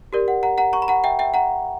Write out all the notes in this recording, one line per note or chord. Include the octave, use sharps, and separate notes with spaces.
G4 A#4 D5
F#5
F#5 A#5
F#5 A#5
A#5 C#6
B5
F#5 A#5
E5 G5
E5 G5
F#5 A#5